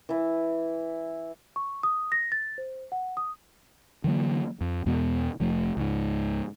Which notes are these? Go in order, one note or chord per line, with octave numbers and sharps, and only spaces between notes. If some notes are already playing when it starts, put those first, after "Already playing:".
E3 E4
C#6
D#6
A#6
A6
C5
F#5
D#6
D3 E3 F#3 A#3
F2
E2 B2 G#3 B3
F1 F3 A3
C#2 G#2